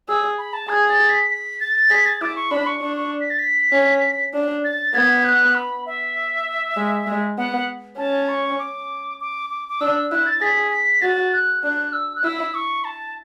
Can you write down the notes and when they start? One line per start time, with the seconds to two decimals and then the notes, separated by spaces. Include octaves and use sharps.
0.08 G#4 E6
0.38 B5
0.53 A5
0.69 G#4 G#6
0.89 A6
1.09 B6
1.30 B6
1.60 A6
1.90 G#4 B6
2.06 A6
2.21 E4 D6
2.36 C#6
2.51 D4 B5
2.67 C#6
2.82 D4 C#6
2.97 C#6
3.21 B6
3.30 A6
3.39 B6
3.72 C#4
4.34 D4
4.64 A6
4.94 B3 G#6
5.25 F#6
5.55 B5
5.86 E5
6.77 G#3
7.07 G#3
7.38 B3 F#5
7.98 C#4 A5
8.29 C#6
8.59 D6
9.20 D6
9.50 D6
9.69 D6
9.81 D4 E6
9.96 E6
10.11 E4 F#6
10.26 A6
10.41 G#4 B6
10.71 B6
11.02 F#4 A6
11.33 F#6
11.63 D4 F#6
11.93 E6
12.16 F#6
12.24 E4 E6
12.54 C#6
12.84 A5